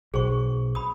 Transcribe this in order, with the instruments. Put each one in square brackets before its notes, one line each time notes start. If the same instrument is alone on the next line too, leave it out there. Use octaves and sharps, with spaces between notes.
[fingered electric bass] B1 [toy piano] G#4 C5 C#6
[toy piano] B5 D#6